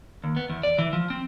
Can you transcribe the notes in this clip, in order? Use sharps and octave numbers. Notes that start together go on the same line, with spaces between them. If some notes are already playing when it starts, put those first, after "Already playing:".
D#2
B3
E2
D5
E3
F3
C4